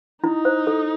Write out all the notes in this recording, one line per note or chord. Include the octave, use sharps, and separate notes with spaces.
D#4 E4
C5
A4